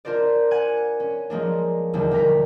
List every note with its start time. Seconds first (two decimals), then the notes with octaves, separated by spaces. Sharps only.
0.05 D4 F4 A#4 C5 D5
0.51 F#5 G#5 F#6 G#6
1.00 C#4
1.30 F3 G#3 A#3 D4
1.93 E1 D#2 D3 G3
2.11 D2 G3 A#4 B6